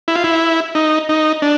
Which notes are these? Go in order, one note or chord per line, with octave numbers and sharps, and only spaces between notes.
E4
F4
E4
D#4
D#4
D4